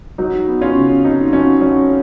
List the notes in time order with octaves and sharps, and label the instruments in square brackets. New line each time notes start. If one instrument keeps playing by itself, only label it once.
[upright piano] F#3 D#4
B3
C#4 F4
C#3
F2 D#4
F#3 C#4
F#3 C#4